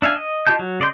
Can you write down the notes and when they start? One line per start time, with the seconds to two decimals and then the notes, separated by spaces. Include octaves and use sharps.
0.02 D4 E5 F5 G#5
0.16 D#5
0.47 F4 G4 D#5 A5 G6
0.59 F#3
0.80 C#3 D5 D#5 C6 G6